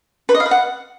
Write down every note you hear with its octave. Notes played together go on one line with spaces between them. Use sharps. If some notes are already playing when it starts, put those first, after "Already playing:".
B4
D#5
F5
B4
F#5